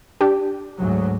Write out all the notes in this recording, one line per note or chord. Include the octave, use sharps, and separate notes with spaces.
D4 G4
D2 G#2 F#3